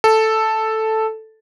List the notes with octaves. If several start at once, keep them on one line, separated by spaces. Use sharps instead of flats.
A4